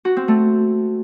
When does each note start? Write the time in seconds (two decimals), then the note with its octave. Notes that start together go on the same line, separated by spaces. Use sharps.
0.05 F#4
0.17 C4
0.28 A3